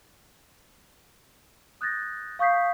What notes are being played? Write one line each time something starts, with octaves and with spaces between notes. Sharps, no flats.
D#6 F#6 G6 A6 A#6
F5 C#6 D#6 G6 B6 C7